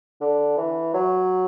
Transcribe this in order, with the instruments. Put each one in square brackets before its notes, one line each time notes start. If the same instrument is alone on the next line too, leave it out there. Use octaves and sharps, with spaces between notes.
[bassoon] D3
E3
F#3